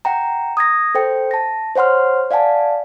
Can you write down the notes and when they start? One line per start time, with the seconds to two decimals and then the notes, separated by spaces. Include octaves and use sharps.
0.05 F#5 G5 A#5
0.57 D#6 G#6 A#6
0.95 A4 C5 G5
1.31 A5 A#6
1.75 C5 C#5 F#5 C6 F6
2.31 D5 F5 F#5 G#5 A5